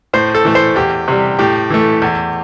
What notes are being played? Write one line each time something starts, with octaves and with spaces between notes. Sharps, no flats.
A2 C5
A4
E3 A3
C5
E2 G4
C3 G3
A2 G4
E3 A3
E2